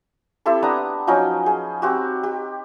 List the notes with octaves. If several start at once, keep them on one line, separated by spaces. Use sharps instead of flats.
C4 E4 G4 A4
B3 D4 A#5 D#6
F3 F#3 C#4 D#4
G#4
C4 F#4 G4
G4